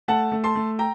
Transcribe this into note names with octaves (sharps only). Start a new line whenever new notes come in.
A3 F#5 A5
A3
A5 C6
A3
G5 A#5